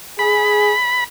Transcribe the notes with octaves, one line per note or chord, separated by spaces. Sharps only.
G#4 B5